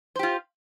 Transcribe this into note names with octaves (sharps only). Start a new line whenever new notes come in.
F4 G4 C5